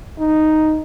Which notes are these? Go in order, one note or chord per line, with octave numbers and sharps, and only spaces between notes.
D#4